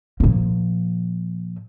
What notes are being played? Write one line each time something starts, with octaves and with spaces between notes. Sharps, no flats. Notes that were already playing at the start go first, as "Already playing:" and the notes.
A#2 F3